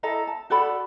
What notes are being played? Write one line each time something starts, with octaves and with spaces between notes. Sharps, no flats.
E4 A4 D#5 A#5
A5
F#4 A4 D5 B5